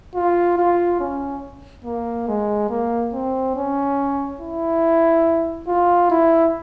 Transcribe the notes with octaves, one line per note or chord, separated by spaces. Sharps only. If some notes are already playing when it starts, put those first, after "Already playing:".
F4
F4
C#4
A#3
G#3
A#3
C4
C#4
E4
F4
E4